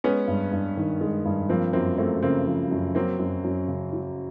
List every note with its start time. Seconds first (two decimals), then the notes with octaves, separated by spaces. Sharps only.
0.04 G#3 B3 C#4
0.27 G2
0.52 G2
0.77 D#3
1.01 G#3
1.25 G2
1.49 F3 A#3 C4
1.73 F#2 A#3 C4
1.98 A3 A#3 C4
2.23 C#3 A#3 C4
2.47 F3
2.71 F#2
2.95 F#3 A#3 C4
3.19 F#2
3.44 F#2
3.68 C#3
3.93 F#3